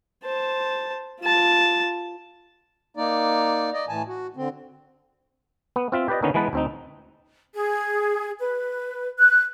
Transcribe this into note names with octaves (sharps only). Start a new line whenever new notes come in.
C5 A5
F4 A5
A#3 D#4 D5
D5 D#5
A2 E3 G#5 A5
F#4
D3 C4
B3
C4 F4 E5
G4 B4 D5 D#5
D3 D#3 B3 C#4 D#4
E3 G#3 B3 B4 A5
D2 C4 D#4
G#4
B4
F#6